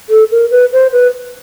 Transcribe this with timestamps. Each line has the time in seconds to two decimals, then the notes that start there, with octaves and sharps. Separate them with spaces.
0.09 A4
0.31 A#4
0.51 B4
0.73 C5
0.92 B4